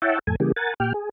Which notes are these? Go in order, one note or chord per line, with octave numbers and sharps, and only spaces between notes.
E4 C#5 E5 F#5 G5 A5
F2 A2 A4 G#5
C#3 E3 G3 A#3 G4 G#4
A#4 F#5 G#5 A6
A#2 G4 G5 F6
G#4